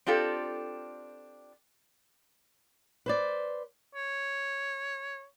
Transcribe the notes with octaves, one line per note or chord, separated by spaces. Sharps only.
C4 D4 F4 G4 A4
B4 C5 D5
C#5